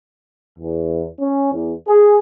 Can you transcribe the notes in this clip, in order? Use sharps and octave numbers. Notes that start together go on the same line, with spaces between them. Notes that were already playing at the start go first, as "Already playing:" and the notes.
E2
C#4
E2
G#4